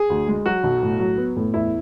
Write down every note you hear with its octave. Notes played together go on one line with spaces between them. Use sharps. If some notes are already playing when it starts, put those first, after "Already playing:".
Already playing: G#4
D2
G#3
F#3 F#4
B1
A2
F#3
B3
A2
E2 E4